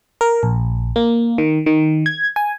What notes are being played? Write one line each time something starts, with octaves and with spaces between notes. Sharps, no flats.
A#4
A#1
A#3
D#3
D#3
G#6
G#5